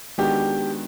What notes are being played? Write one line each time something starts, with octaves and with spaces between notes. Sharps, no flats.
D#3 G#3 B3 D4 F#4 G4